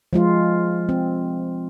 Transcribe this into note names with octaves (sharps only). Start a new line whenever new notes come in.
F3 G#3 F4
C4